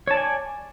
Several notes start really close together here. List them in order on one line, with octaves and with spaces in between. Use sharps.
C#5 A5 D5 G#5